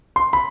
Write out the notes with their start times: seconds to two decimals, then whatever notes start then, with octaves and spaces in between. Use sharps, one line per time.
0.16 C6
0.33 B5